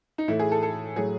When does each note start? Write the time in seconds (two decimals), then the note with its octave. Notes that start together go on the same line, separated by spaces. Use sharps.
0.18 D#4
0.28 A2 E3 A3 E4
0.39 G#4
0.52 A4
0.63 A4
0.96 A2 F#3 A3 G#4